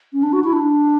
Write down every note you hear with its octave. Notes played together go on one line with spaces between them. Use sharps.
C#4
D4
F#4
E4
D4